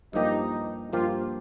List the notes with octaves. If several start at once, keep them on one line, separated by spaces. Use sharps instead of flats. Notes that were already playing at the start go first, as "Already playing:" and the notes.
G2 F3 A#3 D#4 G4
G2 F3 A#3 F4 G4